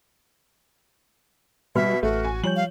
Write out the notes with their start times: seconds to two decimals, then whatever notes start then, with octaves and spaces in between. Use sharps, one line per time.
1.75 B2 G3 B4 E5 F6
2.03 A1 A3 F#4
2.25 G#5
2.44 F3 G3 C#5 G6 F#7
2.56 F5